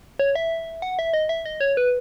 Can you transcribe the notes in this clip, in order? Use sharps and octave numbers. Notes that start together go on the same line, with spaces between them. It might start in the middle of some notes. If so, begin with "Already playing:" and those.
C#5
E5
F#5
E5
D#5
E5
D#5
C#5
B4